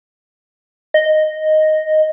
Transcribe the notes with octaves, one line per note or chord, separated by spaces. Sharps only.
D#5